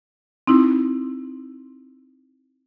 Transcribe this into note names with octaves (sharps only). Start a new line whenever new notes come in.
C4 D#4 E4